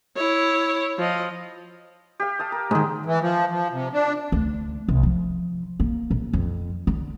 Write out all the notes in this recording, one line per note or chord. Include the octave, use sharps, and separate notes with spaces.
E4 C#5
F3 D#5
G4 F5
F5 A5 D#6
A#4
G#2 D#3 G#3 G#4 D#5
E3
F3
F3
C3
D4
D2
C2
F3
A#3
A#1
F2
D3